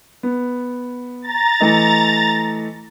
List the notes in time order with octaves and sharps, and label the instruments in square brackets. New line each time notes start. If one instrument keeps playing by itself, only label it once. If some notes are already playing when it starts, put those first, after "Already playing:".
[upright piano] B3
[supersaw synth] A#5 A6
[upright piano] E3 A3 D#5